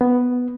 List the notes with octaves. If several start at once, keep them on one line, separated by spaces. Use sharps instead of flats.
B3